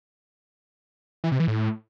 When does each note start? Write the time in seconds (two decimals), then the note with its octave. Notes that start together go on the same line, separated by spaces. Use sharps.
1.24 E3
1.32 C3
1.40 E3
1.48 A2